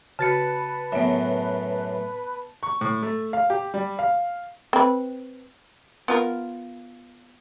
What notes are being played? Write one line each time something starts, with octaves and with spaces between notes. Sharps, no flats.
C#3 F#4 B4 A5 A6 C#7
F#2 A2 B3 E5
C#6
A2
A3
F5
G4
G3
F5
C4 B4
B3 F4 A#4